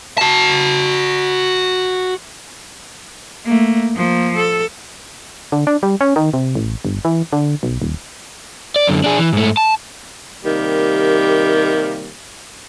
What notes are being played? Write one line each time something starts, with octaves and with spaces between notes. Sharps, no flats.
F#4 A5
A3 A#3
F3 A#3
A4
D3
D4
G3
C#4
D#3
C3
A1
G1
E3
D3
B1
D#1
D5
F#2 D3
D4 G#4
E3
G#2 A3
A5
C3 D#3 G3 A#3